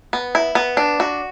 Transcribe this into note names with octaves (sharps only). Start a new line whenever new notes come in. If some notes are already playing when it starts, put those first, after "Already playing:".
B3
E4
B3
D4
F#4